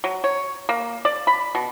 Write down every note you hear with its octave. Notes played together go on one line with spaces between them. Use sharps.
F#3
C#5
A#3
D5
B5
B2